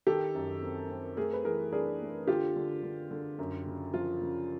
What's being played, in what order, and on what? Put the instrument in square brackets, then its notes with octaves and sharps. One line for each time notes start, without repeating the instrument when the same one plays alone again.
[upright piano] D#3 G4 A4
F#2
C4
C4
A3 G#4 A#4
B4
E3 G#4 A#4
D4 G#4 A#4
A3
D3 F4 G4
D3
D3
D3
F#2
C#3
F3 F4
C#3